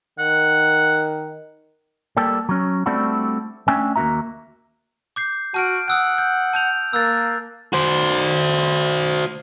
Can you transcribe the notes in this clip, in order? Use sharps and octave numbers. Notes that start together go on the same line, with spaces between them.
D#3 F#5
G3 A#3 G4 A4
F#3 C#4
G3 A3 C4 D4 E4 F#4
A3 C#4 D4 E5 G5 G#5
D#2 A#3 E4 F#4 E5 A#5
D6 G6 C7
F#4 A5 F6 D7
F#5 D#6 E6 F#6
G6
A5 G6 F7
A#3 E6 F#6 A6
F#4 C5